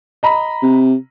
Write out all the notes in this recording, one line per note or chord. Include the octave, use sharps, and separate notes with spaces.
D#5 A#5 B5
C3